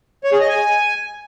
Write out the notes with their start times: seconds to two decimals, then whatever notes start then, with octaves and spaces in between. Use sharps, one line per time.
0.24 C#5
0.32 G#4
0.40 D#5
0.49 G#5